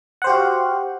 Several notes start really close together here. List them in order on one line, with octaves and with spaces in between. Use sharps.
F#5 C5 G4 F#4 F5